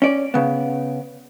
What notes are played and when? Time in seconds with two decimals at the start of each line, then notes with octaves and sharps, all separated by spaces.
0.02 C#4 D5
0.34 C#3 B3